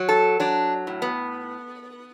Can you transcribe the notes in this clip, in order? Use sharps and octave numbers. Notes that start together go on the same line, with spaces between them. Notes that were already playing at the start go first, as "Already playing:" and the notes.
Already playing: F#3
A4
F#3 D4
A2
B3